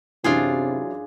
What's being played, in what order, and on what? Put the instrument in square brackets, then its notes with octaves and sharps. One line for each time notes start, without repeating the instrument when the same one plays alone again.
[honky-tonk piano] F#2 E3 [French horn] C3 [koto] D4 F4 G#4